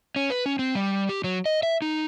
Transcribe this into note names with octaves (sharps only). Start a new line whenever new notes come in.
C#4
B4
C#4
C4
G3
G4
F#3
D#5
E5
D#4